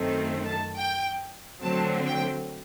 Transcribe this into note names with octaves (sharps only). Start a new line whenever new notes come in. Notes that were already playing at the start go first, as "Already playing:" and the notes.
Already playing: F#2 D#3 A3 C4
A5
G5
D3 F#3 A3 C4 A5
G5